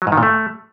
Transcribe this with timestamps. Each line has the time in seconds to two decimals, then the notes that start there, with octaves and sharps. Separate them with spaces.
0.02 F#3
0.07 G#2
0.12 D#3
0.17 A#2
0.23 A3